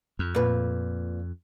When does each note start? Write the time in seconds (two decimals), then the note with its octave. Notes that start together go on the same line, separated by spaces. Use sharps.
0.19 F2
0.35 A#2 B4